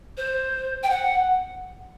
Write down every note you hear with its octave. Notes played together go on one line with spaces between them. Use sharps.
C5
G5
F#5